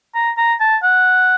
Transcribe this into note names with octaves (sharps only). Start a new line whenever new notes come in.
A#5
A#5
A5
F#5